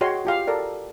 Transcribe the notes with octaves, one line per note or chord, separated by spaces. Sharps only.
F#4 G#4 C#5 D#5 G5 C6
F4 G4 F5
A4 A#4 D5